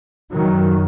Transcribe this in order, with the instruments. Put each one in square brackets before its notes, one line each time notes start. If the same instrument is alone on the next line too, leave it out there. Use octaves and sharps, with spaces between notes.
[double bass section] F#2 D#3 F#3